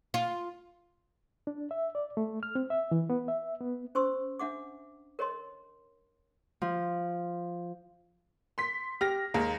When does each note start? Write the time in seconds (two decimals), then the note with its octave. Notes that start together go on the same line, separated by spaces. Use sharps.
0.14 F4
1.47 D4
1.71 E5
1.95 D5
2.17 A3
2.43 F6
2.55 C4
2.70 E5
2.91 E3
3.10 B3
3.28 E5
3.61 B3
3.95 C#4 C5 C6 C#6 E6
4.39 D4 E5 F#5 D6
5.19 A#4 C#5 D#5 C6
6.62 F3
8.58 C6 B6
9.01 G4 F6 A#6
9.34 D#2 G#3 A#3 A#4